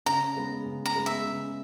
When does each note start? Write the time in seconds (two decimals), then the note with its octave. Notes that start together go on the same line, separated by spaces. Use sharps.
0.06 C#3 A#5
0.36 G#3 B3
0.66 C#3
0.86 A#5
0.96 G#3 B3
1.06 E5
1.25 C#3